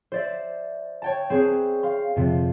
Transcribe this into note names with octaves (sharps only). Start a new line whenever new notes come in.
C5 D5 E5
C#5 G5 A5
C4 G#4 B4 C#5
F5 C6
F2 C3